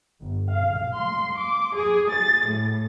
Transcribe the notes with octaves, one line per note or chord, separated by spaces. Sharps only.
G1
F5
C6
D6
G#4
A6
A2